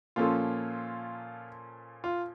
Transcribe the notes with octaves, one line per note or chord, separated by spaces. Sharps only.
A#2 F3 A#3 C#4 F4 A4
F4